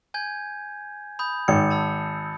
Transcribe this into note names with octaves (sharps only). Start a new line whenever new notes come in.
G#5 G6 G#6
B5 D#6 G6
G#1 C#7
A5 B5 E6